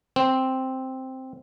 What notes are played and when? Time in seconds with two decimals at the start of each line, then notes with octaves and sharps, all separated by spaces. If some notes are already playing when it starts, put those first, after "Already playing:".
0.16 C4